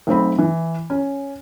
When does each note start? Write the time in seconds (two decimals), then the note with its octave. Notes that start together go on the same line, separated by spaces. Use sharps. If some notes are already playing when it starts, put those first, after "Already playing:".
0.07 B1 A3 C4 B5
0.38 E3
0.90 C#4